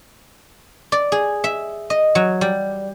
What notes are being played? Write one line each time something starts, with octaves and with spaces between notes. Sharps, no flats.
D5
G#4
E5
D#5
F#3
G3